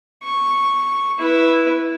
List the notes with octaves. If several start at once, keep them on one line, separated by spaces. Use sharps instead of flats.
C#6
E4 B4